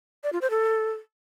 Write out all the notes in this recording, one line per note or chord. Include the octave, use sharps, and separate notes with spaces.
D5
F4
C5
A4